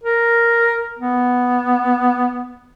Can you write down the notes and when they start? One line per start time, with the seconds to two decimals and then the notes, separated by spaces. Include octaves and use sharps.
0.03 A#4
0.99 B3